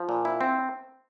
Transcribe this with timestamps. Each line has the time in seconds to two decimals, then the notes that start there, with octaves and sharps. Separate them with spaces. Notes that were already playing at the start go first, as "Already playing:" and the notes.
Already playing: F3
0.09 A#2
0.25 E4
0.41 C4